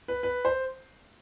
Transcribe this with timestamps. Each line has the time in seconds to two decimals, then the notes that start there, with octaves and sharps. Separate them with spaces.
0.08 B4
0.23 B4
0.45 C5